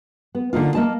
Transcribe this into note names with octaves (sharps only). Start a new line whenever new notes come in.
B3
D3 A#3 D#4 F4
A#3 D#5 A5